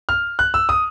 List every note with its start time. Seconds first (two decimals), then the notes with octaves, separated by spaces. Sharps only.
0.09 F6
0.39 F#6
0.54 E6
0.69 D#6